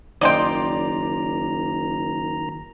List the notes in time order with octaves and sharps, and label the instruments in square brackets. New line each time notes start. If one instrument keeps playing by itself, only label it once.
[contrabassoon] F#1 [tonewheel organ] D#3 A#5 [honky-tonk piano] D5 C6 [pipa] D#5 F5 G5